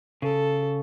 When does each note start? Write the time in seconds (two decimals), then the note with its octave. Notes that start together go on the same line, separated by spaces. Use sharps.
0.22 C#3 A4